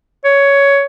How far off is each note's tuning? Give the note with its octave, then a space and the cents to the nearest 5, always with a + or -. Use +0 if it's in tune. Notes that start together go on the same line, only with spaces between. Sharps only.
C#5 +10